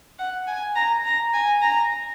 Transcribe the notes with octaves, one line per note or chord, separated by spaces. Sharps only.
F#5
G#5
A#5
A#5
G#5
A#5